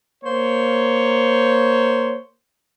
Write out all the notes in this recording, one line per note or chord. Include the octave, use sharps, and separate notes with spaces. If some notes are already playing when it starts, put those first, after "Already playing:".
A#3 C5 C#5